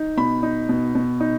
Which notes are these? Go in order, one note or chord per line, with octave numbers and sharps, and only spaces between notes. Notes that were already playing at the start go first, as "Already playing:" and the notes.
Already playing: D#4
B2 B5
D#4
B2
B2
D#4